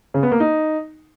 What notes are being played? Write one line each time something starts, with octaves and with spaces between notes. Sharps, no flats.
C#3
B3
A#3
D#4